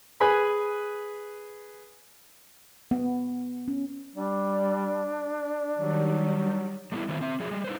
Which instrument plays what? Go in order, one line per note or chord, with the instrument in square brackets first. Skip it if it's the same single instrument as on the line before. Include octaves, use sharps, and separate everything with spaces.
[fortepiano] G#4 B4 G#5 B5 F#6
[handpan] B3
C#4
[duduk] G3 [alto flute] D4
[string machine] D#3 G3 [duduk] F#3
[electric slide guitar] G3 A3 B3 D#4 E4
D#3 F3 A3 C4 E4 F4
C4 E5
F3 F#3 G#4
G3 G#3
D#4 B4 C5